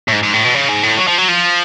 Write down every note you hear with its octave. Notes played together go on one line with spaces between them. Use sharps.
A2
G#2
G#2
A2
B2
C#3
G#2
A2
F#3
F3
F#3
F3